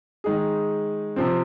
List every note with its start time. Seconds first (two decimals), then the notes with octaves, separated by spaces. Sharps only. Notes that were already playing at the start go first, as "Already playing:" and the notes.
0.24 D#3 G#3 D#4 G#4
1.16 C3 F3 C4